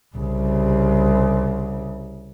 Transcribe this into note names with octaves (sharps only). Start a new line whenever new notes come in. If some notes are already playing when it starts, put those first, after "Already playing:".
C2 C#3